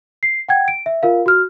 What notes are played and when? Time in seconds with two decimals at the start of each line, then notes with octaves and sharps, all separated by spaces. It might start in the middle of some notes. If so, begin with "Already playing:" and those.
0.23 C7
0.49 F#5 G5 G#6
0.68 D7
0.86 E5
1.03 F4 A#4 F5
1.26 F#4 F6